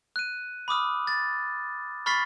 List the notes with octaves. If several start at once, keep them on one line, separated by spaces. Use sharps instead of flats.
F#6 D#7
B5 D6 D#6 F6
A6
B5 C#6 F6 A6 B6 C7